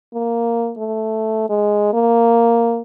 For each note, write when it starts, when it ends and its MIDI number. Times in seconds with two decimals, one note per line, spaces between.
0.14 0.72 58
0.78 1.46 57
1.49 1.93 56
1.93 2.82 58